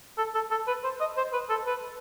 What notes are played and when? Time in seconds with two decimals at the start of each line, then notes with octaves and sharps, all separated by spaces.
0.18 A4
0.35 A4
0.51 A4
0.67 B4
0.84 C5
1.00 D#5
1.17 C5
1.33 B4
1.49 A4
1.66 B4